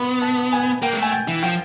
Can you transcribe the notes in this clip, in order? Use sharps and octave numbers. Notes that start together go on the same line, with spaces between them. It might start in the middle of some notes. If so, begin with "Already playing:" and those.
Already playing: B3 B5 C6
A5
G#5
A#3 G5
G#3
A3 G#5
G5
E3
F3 G5